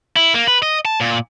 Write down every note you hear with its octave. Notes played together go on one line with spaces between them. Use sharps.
E4
A#3
B4
D#5
A5
A#2